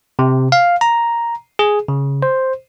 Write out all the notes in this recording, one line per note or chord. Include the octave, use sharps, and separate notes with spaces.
C3
F5
A#5
G#4
C#3
C5